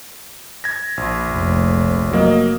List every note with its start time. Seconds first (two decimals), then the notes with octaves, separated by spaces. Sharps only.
0.64 G#6 A#6
0.97 A#1
1.31 F1
2.11 F#3 A#3 D#5